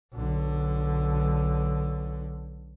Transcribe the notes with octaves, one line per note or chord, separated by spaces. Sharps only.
B1 D3